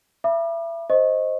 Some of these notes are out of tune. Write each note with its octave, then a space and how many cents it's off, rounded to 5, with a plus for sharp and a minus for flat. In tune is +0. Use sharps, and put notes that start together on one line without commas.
E5 +25 B5 -35 D6 +35
C5 +0 D#5 +0 C#6 -25